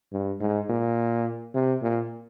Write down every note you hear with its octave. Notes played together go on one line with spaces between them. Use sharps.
G2
G#2
A#2
C3
A#2